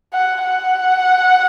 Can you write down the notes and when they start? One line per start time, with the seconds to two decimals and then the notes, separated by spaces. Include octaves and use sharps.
0.13 F#5
0.43 F#5